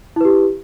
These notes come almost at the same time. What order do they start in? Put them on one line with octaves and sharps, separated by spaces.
E4 B4 G4